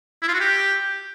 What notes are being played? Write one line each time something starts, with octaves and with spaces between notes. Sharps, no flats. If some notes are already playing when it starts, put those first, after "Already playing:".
E4
F4
F#4
G4